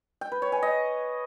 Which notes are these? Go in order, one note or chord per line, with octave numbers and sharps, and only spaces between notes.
G5
B4
C#5
G#5
D#5